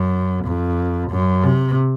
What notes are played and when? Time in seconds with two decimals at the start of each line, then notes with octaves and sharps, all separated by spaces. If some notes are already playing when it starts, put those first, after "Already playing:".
Already playing: F#2
0.45 F2
1.11 F#2
1.43 C3